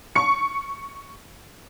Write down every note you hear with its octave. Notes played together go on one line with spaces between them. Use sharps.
C#6 C#7